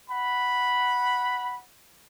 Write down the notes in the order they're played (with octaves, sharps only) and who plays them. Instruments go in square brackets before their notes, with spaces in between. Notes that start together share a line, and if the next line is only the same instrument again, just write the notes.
[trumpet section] F#5 B5